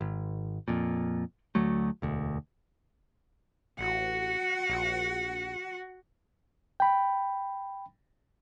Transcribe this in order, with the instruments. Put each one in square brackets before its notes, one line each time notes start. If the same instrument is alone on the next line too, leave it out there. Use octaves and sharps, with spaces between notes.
[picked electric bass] G#1
F2 A#2
D2 F#3 A3
E1 D2
[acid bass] A1 [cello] F#4 F#5
[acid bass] A#1
[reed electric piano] G5 B5